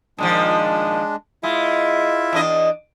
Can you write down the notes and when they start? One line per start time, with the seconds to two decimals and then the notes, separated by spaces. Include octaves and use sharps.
0.18 A#2 D#3 F3 G#3 D4
1.43 G#3 E4 F4 E5
2.33 E2 D4 D#5